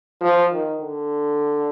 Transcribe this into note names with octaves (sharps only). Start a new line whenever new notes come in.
F3
D#3
D3